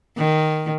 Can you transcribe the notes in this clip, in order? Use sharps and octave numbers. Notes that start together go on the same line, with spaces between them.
D#3